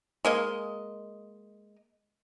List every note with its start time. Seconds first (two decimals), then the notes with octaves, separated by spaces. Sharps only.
0.25 G#3 A#3 D#5